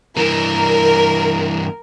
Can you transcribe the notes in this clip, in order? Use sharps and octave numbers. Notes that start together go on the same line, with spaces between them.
G2 E3 A#4